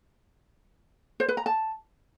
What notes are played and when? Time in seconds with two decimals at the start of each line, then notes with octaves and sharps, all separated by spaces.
1.20 C5
1.29 B4
1.37 A#5
1.46 A5